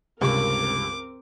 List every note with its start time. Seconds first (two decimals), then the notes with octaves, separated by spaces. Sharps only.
0.22 C#2 G2 C3 C4 A#4 C#6 D6